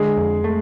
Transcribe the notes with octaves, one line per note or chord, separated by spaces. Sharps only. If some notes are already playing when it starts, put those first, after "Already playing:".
Already playing: D3 G#3 G#4
F2
A3